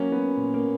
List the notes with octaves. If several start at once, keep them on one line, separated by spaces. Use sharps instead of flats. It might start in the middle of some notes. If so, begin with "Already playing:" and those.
Already playing: F#3 A#3 C#4
F#3 B3
A#2
A#3
A#2